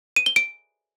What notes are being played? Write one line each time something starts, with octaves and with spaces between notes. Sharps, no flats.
D#7
G7
D7